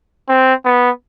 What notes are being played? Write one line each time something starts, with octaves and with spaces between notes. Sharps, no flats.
C4
B3